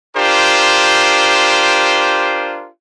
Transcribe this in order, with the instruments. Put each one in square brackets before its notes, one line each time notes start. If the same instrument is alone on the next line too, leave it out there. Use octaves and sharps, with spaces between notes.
[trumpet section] D4 F4 G4 A#4 C5